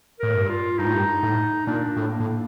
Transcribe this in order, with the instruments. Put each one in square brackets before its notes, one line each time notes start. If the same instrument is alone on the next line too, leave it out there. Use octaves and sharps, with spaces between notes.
[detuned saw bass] A2 [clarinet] A#4
[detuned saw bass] G2
[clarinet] F4
[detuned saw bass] G2 [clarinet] D#4
[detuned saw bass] A2
G2
A2
[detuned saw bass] A#2 [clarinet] D4
[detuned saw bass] A2
[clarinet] A#3
[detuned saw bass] A2